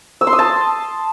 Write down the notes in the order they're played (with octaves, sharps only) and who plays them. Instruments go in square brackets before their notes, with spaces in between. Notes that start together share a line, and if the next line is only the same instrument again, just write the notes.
[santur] E6
C6
D#6
A5